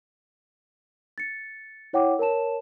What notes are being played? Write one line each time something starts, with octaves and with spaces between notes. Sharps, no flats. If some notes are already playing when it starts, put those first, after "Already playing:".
A6 C#7
E4 C#5 F#5 G5 D6
A#4 C#5 A5 E7